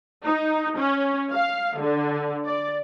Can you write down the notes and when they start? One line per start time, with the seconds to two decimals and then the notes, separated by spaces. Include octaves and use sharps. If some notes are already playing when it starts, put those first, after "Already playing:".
0.25 D#4
0.77 C#4
1.34 F5
1.79 D3
2.45 D5